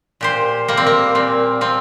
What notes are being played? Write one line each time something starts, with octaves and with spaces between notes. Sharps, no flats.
A#2 G4 C5
G3 A#3
C4
A#3
A#2 C4
F3 C4